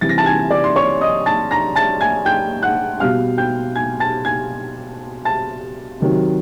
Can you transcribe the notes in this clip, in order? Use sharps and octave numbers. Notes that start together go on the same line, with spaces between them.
C3 E3 G3 A6
A#6
A5 A6
G#5 G#6
D5 D6
C6
C#5 C#6
D#5 D#6
A5 A6
A#5 A#6
A5 A6
G#5 G#6
G5 G6
F#5 F#6
B2 G3 F5 F6
G5 G6
G#5 G#6
A5 A6
G#5 G#6
A5 A6
C3 D#3 F#3